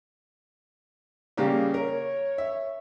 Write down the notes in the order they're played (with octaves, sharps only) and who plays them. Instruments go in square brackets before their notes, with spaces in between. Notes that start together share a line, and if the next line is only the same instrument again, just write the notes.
[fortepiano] C#3 G3 A#3
[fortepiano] A#4 [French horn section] C#5
[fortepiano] E5